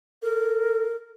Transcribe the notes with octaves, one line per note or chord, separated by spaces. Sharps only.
A4 A#4